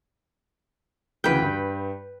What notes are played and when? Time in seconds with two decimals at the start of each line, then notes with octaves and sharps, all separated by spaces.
1.24 D2 C#3 E3 B4 G5
1.42 G2